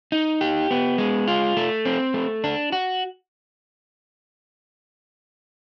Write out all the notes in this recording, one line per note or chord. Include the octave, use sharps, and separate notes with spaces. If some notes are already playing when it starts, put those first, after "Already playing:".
D#4
G4
B3
G#3
F4
A3
C4
A3
D4
F#4